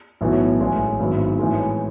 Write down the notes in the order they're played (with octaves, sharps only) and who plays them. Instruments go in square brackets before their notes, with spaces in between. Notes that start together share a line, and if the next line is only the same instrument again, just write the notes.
[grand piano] B1 A2 E3 B3 F#4
A1 A2 G#3 B3
G#1 G#2 F#3 B3 E4
A2 E3 G#3